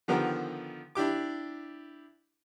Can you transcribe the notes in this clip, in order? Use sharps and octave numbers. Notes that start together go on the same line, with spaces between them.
D3 D#3 F3 B3 G4 A#4
D4 E4 G4 D6